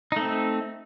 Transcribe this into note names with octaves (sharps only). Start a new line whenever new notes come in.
A3 C4 D#4